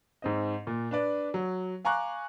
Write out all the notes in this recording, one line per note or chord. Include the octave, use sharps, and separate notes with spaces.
G#2 C4 D#5
A#2
D4 B4 D5
F#3
F5 G#5 A#5 C#6 D6 F#6